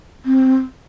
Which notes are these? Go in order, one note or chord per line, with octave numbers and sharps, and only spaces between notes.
C4